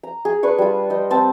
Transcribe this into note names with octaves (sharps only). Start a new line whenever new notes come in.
A#5
G#4
D4 B4 C#6
G3 F4
D#5 G5
C4 A5